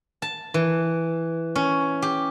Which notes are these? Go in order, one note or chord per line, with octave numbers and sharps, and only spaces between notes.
A5
E3
C#4
G4